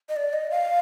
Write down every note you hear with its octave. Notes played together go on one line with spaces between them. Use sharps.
D#5
D5
D#5
F5